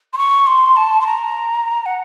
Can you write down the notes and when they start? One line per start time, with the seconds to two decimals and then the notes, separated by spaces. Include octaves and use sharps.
0.13 C6
0.17 C#6
0.47 C6
0.76 A5
1.01 C6
1.06 A#5
1.86 F#5